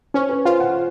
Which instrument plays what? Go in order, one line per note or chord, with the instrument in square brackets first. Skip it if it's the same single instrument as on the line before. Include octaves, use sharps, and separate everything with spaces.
[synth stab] C#4 [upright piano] C5
[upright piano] B4
[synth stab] F4 [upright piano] C5
[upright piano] F#5